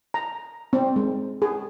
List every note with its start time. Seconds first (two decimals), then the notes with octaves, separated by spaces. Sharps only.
0.14 A#5
0.73 C4
0.96 G#3
1.42 G#4